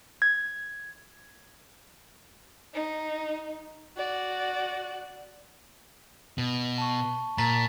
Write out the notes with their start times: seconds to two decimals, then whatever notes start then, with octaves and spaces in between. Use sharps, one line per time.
0.22 G#6
2.74 D#4
3.97 F#4 D5
6.38 B2
6.78 A5 C#6
7.38 A#2 A#5 A6 B6